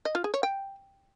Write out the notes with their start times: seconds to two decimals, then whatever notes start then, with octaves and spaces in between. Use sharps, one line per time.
0.05 D#5
0.15 F4
0.24 G#4
0.34 C#5
0.43 G5